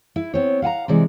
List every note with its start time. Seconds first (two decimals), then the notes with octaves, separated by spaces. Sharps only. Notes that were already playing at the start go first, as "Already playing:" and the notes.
0.16 E4
0.34 B3 C4 C#5
0.62 F5 F#5 G#5 A#5
0.88 C3 E3 G#3 D5